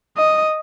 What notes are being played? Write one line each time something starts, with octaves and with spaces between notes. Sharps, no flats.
D#5